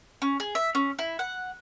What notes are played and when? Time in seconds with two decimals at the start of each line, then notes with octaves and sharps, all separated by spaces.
0.22 C#4
0.40 G#4
0.55 E5
0.75 C#4
0.99 E4
1.19 F#5